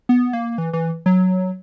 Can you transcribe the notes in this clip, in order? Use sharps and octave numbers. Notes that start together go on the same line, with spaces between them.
B3
A#3
E3
E3
F#3